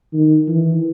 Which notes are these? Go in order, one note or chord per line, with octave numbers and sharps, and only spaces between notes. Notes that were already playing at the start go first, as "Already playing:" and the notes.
D#3
E3